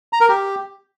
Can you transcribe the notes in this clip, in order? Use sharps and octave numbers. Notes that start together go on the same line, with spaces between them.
A#5
A#4
G4